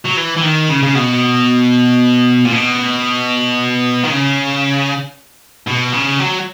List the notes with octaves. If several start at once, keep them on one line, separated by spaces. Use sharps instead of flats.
F#3
E3
E3
D#3
C#3
C#3
B2
A#2
B2
D#3
C#3
B2
C#3
F#3